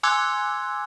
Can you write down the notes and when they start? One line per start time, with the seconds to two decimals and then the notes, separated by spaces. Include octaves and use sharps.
0.03 G#5 C6 D6 E6 F#6 G#6